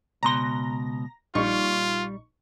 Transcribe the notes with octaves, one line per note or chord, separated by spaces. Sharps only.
C#2 B2 A#5 C6 A#6
A#1 G3 D#4 F4 C#6